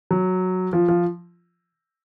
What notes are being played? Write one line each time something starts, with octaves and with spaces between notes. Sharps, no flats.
F#3
F3
F3